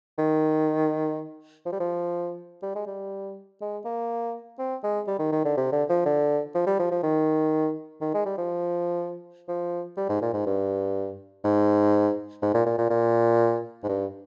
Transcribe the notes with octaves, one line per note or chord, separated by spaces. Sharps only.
D#3
F3
G3
F3
G3
G#3
G3
G#3
A#3
C4
G#3
G3
D#3
D#3
D3
C3
D3
F3
D3
F3
G3
F3
F3
D#3
D#3
G#3
G3
F3
F3
G3
G#2
A#2
G#2
G2
G#2
G#2
A#2
A#2
A#2
A#2
G#2
G2